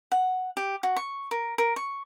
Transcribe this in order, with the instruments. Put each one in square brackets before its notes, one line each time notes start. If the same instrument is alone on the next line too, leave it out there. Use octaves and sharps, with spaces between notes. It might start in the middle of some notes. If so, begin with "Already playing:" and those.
[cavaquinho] F#5
G4
F#4
C#6
A#4
A#4
C#6